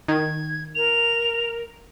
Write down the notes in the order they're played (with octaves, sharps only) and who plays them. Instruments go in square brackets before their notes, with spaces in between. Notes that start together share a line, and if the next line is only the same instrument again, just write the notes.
[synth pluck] D#3 [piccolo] G#6
[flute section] A#4 [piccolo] F7